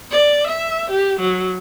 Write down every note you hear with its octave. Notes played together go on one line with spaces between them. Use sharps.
D5
E5
G4
F#3